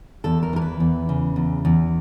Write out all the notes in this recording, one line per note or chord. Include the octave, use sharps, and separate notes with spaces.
E2 A4
A#4
E3 A#4
B4
E2
C#3
E2
E2